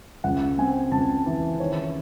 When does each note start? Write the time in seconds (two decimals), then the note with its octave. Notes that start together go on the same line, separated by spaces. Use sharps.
0.24 C#2 F#5
0.58 C4 G#5
0.92 C#2 A5
1.26 E3
1.60 D#3 C#5